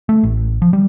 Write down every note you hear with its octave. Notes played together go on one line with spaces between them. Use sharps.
A3
A1
F3
G3